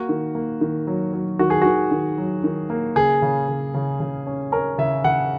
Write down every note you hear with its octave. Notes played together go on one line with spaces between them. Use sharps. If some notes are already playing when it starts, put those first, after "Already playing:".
Already playing: A#3 F#4
D#3
A#3
D#3
F#3
F#3
D#3 F#4
G#4
D#3 F#4
D#3
F#3
D#3
A#3
C#3 G#4
C#3
C#3
C#3
C#3
C#4
C#4 A#4
C#3 E5
C#3 F#5